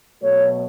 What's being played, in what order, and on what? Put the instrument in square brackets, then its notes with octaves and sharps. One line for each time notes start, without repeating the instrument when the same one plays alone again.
[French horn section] B2 F#3 A3 C#5